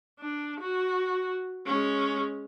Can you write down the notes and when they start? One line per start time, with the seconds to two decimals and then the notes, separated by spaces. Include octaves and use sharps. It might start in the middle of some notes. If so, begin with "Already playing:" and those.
0.20 D4
0.60 F#4
1.67 G#3 C#4